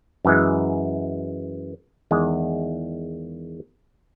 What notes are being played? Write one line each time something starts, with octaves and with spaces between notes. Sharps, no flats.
F#2 E3 G#3
E2 D#3 G#3